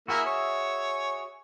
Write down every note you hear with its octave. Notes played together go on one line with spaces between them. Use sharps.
A#3 E4 F#4 G#4 E5
C#5